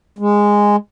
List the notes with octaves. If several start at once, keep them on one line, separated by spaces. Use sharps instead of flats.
G#3